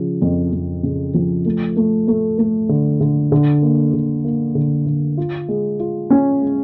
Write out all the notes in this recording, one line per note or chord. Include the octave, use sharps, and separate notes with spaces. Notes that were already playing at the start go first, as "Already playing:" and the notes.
Already playing: C#3 F3
F2
F2
C#3
F3
A3
A3
A3
A3
D3
D3
D3
A#3
D3
A#3
D3
D3
F4
G#3
F4
C#4
G#3